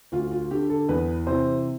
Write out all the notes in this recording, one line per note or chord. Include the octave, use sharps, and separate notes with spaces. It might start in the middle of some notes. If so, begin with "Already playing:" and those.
D2 F4
F4
D3 G4
A4
E2 B4
C3 E3 C5